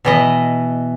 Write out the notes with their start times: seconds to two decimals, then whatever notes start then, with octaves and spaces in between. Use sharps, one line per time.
0.05 B2 E3 D#5